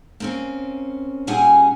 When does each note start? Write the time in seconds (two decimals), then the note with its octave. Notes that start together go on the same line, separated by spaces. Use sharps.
0.20 A#3 C4 C#4
1.27 A#2 G3 C#4 G#4 F#5 G#5